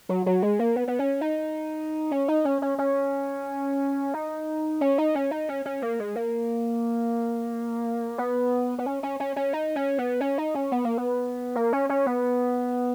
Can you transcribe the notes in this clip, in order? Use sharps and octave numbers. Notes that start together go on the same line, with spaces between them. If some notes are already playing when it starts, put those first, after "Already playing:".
F#3
F#3
G#3
A#3
B3
B3
C#4
D#4
C#4
D#4
C#4
C#4
C#4
D#4
C#4
D#4
C#4
D#4
C#4
C#4
A#3
G#3
A#3
B3
B3
C#4
C#4
C#4
C#4
D#4
C#4
B3
C#4
D#4
C#4
B3
A#3
B3
A#3
C#4
C#4
B3